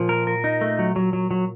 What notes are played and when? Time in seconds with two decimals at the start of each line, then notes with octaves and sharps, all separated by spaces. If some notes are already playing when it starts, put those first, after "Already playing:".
Already playing: A#2 F3
0.09 A#4
0.27 A#4
0.44 D#4
0.61 A3
0.79 F#3
0.96 F#3
1.13 F#3
1.31 F#3